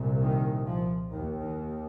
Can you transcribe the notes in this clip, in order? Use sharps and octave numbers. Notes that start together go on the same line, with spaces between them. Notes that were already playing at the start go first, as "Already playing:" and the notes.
Already playing: C2 A#2
D#3
F3
D#2 D#3
D#3